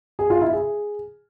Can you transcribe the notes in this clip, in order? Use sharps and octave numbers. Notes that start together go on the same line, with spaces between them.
G#4
F4
E4
G#4